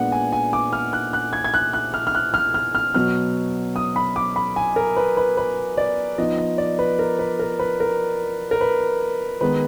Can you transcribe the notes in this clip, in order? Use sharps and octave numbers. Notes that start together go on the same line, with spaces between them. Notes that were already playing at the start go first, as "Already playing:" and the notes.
Already playing: A#2 G#3 B3 D4 F#5
G#5
G#5
D6
F6
F#6
F#6
G#6
G#6
F#6
F#6
F6
F6
F#6
F6
F6
F6
B2 F#3 B3 F6
D#6
B5
D6
B5
G#5
A#4
B4
B4
B4
D5
F3 B3 D#4 D#5
D#5
D5
B4
A#4
B4
A#4
B4
A#4
A#4
B4
D#3 G#3 B3 D#4 B4